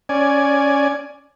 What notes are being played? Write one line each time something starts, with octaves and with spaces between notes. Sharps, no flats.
C#4 D5 G#5